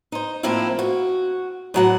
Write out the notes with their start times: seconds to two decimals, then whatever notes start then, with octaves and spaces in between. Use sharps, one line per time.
0.12 D#4 C5
0.43 A2 F3 A#3 C4 E4 F4
0.79 F#4
1.74 A2 F#3 F#5